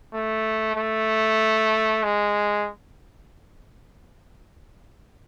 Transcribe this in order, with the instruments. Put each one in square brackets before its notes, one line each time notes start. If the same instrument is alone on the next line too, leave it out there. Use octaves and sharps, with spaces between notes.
[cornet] A3
A3
G#3